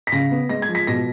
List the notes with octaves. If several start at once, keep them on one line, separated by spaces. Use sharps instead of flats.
B6
C#3 A#6
B3
G#3 A#6
G#6
F3
B6
B2 A#6